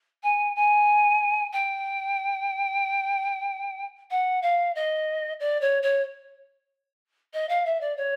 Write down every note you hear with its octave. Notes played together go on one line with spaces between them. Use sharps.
G#5
G#5
G5
F#5
F5
D#5
D5
C#5
C#5
D#5
F5
E5
D5
C#5